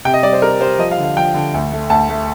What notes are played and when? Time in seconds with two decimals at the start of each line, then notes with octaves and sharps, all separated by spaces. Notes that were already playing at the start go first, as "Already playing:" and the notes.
0.05 C3 G5
0.14 D#5
0.23 G3 D5
0.33 C5
0.42 G3 A#4
0.61 G3 C5
0.79 F3 D#5
0.91 F5
0.98 D3
1.04 F5
1.17 F3 G5
1.34 D3
1.54 D2
1.72 A3
1.90 D2 A5
2.09 A3